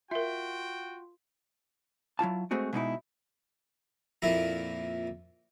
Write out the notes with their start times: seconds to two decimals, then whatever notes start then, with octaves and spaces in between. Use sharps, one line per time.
0.11 F4 F#4 A#4 E5 G5
2.19 F#3 E4 F4 A5
2.51 G#3 A3 C4 F#4 G#4
2.73 B2 G#3 D#4 E4
4.22 F2 A#2 E4 A#5